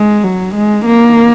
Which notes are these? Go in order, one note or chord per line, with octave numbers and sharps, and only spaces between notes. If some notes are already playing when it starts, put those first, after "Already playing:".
Already playing: G#3
F#3
G#3
A#3